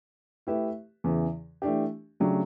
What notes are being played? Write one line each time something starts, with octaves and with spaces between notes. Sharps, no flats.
A3 E4 G4 B4 E5
E2 C#3 E3
E3 A3 D4 G4
C#3 F#3 A3 D4 G4